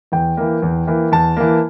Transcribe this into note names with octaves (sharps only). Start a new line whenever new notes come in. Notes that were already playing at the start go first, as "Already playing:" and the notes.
E2 G5
E3 A#3
E2
E3 A#3
E2 A5
E3 A#3